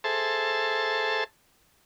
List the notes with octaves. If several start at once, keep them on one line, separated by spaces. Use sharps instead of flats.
G#4 A4 C5 E5 A5